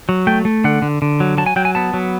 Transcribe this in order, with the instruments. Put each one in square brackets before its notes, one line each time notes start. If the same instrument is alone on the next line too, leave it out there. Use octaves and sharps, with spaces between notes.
[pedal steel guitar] F#3
A3 G5
A3
D3 F#5
D3
D3
F#3
F#3 A5
G#5
F#3 G5
G#5
B3 A5
F#3